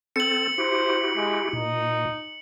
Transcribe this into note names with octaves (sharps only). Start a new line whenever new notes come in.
C4 A4 C#7 F#7
E4 F#4 G4 C5
G#3
A#2 D#4